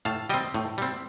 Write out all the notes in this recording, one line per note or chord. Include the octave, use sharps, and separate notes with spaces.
A2 F5 A5
G3 C4 D#5 G5
A2
G3 C4